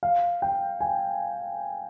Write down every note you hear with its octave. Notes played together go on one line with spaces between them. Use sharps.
F5
G5
G#5